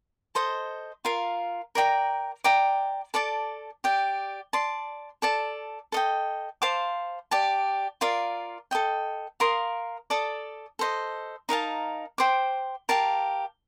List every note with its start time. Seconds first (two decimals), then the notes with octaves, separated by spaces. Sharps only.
0.35 A4 C5 D#5
1.05 F4 A#4 F5
1.75 A#4 D5 G5 A#5
2.44 D5 G5 A#5 D6
3.14 A4 D5 A5 D6
3.84 G4 D5 G5
4.53 D5 A5 C6
5.22 A4 D5 A5
5.92 A4 D#5 G5
6.62 C5 F5 A5 D6
7.31 G4 D5 A5
8.01 F4 A#4 D5 F5
8.71 A4 D#5 G5
9.40 A#4 F5 C6 D#6
10.10 A4 D5 A5 D#6
10.79 A4 C5 D#5
11.49 D#4 A#4 F5 A5
12.18 C5 G5 D6
12.89 G4 A#4 F5 A5